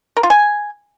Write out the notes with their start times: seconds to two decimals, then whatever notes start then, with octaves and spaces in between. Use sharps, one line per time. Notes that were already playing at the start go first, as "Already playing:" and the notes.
0.17 A#4
0.23 F4
0.30 G#5